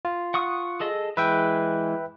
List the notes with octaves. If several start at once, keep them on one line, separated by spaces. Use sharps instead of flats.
F4
F#5 C#6 D#6
G#4 A4 D#5
E3 G#3 B4 E5 G5